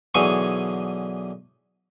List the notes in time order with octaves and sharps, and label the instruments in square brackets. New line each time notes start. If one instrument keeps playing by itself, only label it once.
[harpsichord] B1 D3 E3 G#4 G#5 C#6